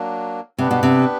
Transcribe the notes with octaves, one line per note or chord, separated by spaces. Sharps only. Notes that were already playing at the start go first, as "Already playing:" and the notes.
Already playing: F#3 A#3 D4
C3 B3 D4 G4 B4
B2
C3